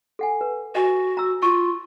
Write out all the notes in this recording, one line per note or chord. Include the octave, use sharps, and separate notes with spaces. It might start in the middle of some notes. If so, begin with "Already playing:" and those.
A4 F#5 G#5
B4
F#4 D#5 G#5
A#5 E6
F4 C#6